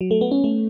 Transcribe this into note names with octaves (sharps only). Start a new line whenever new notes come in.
F#3
A3
B3
C#4
A3